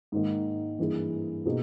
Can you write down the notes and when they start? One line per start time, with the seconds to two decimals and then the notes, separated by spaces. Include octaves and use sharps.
0.12 G#2 D#3 A#3
0.79 G2 E3 A#3 E4 G#4
1.46 B2 A#3 D#4 G#4